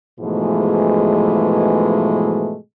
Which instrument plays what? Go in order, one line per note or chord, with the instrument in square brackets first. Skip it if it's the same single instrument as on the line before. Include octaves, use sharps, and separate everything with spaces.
[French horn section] G#2 B2 E3 F3 G#3 A3